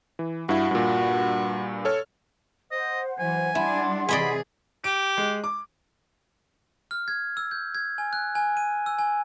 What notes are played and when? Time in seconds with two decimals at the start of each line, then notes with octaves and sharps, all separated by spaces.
0.19 E3
0.49 G2 E4 F#4
0.71 G2 A#2
1.85 A4 C#5 F6
2.71 C5 D#5 F#5
3.19 E3 F#3 G#5
3.55 G3 D4 E4 F#5 C6
4.09 C3 E3 G#4 D5 D#5 G#5 B5
4.84 G4 D7
5.17 G#3
5.44 D6
6.91 F6
7.08 G#6
7.37 E6
7.51 G6
7.75 G#6
7.98 G#5
8.13 F#6
8.35 G#5
8.57 D#7
8.86 E6
8.99 G#5